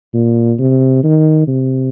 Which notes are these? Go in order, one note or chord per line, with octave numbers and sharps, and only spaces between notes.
A#2
C3
D#3
C3